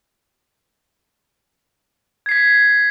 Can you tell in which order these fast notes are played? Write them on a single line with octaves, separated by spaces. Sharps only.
G#6 C7 B6